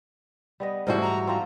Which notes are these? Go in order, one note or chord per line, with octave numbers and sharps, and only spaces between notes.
G3 B3 D#5
G#2 E3 G3 F#4 A4 A#4 C5
A#5
F3 C4 A#5